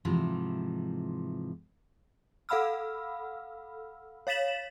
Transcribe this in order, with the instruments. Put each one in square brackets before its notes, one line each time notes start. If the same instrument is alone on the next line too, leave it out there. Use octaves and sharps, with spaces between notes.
[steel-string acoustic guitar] G#2 C3 E3 F3
[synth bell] A4 F5 F#5 B5 E6 F6
C#5 F5 A6 B6 E7 F#7